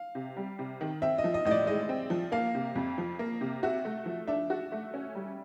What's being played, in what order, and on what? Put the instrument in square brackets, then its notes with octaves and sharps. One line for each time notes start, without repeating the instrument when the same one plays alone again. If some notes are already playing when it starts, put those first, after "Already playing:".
Already playing: [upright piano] F5
[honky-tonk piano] C3
G3
C3
D#3
[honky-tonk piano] C4 [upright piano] E5
[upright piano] D#5
[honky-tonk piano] F3
[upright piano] D#5
[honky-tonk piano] A2 [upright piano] D#5
[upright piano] D5
[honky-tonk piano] G#3 [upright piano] D#5
[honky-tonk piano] C4
F3
[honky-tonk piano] A#3 [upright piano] F5
[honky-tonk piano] C3
F2
F3
A#3
C3
[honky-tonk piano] F#4 [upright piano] E5
[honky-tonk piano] A3
F3
[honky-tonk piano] D4 [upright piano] E5
[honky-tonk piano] F#4
A3
C#4
G3